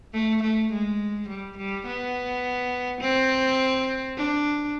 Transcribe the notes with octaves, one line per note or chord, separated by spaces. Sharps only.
A3
A3
G#3
G3
G3
B3
C4
D4